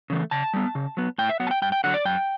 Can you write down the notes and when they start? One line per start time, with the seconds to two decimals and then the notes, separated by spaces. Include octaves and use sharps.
0.10 C#3 E3 A3
0.31 C#3 A5
0.54 G3 B3
0.75 C#3
0.97 F#3 B3
1.18 A2 G5
1.29 E5
1.40 F#3 B3 F#5
1.47 A5
1.51 G5
1.62 G2 G5
1.72 G5
1.84 D3 F#3 F#5
1.94 D5
2.05 F#2 G5